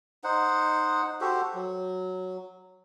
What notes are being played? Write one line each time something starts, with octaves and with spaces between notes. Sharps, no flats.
D#4 C5 F#5
F#4 G4 A4 C5
F#3